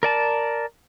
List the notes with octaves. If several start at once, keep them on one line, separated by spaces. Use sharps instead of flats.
A#4 D5 A5